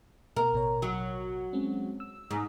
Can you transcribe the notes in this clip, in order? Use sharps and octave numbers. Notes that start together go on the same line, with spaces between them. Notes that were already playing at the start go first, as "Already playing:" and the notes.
B2 A#4
A1 B2 C#5
F#3
G#3 C4 C#4
E6
G#2